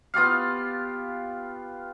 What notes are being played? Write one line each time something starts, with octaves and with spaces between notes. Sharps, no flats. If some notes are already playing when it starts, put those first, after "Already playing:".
B3 F4 G4 F5